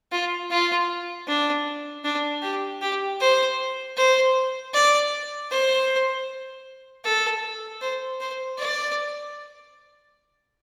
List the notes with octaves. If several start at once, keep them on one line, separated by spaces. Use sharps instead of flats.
F4
F4
D4
D4
G4
G4
C5
C5
D5
C5
A4
C5
C5
D5